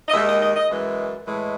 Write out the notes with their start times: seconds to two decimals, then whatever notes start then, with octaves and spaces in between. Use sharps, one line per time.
0.07 D#5
0.12 D#2 D#3 G#3 E5
0.26 D#5
0.40 D#5
0.55 D#5
0.68 F#2 E3 G#3
1.25 A2 E3 G#3